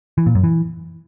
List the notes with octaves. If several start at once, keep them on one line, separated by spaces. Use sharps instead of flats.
E3
A#2
F#2
E3